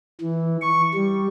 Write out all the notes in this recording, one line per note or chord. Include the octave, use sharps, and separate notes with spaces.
E3
C#6
G3